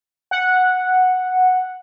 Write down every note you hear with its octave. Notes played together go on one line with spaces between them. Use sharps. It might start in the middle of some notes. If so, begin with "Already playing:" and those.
F#5